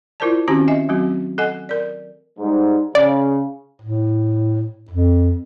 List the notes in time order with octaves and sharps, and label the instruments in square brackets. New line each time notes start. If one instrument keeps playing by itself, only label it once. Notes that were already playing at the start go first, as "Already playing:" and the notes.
[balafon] E4 F4 A#4 C5 D5 A5
D#3 C4 C#4 F#4 G4 A#5
D#5 E5 G#5
F#3 A3 C4 F#4
A4 D#5 F#5 G#5
A#4 D5
[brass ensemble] G#2 G3
[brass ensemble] C#3 [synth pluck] D5
[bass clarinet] A2
F2